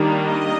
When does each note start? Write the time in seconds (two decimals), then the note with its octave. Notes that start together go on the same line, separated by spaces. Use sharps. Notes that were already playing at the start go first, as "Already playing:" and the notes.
Already playing: D#3 G3 A#3 D4
0.26 D#5